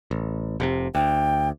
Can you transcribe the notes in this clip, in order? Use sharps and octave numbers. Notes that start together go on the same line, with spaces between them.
A1
F1 A2 C3
D2 G5